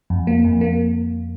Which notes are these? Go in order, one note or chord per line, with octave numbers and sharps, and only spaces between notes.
F2
A#3
F2
A#3